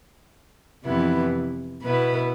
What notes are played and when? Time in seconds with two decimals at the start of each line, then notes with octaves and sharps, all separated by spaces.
0.85 F2 C3 E3 B3 E4
1.83 B2 B3 E4 B4